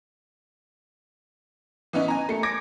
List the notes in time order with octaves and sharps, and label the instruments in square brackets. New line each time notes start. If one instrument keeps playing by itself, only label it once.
[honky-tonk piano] E3 B3 C#4 D#4
G#5 A#5
A3 C#7
D6 G#6 A#6 D7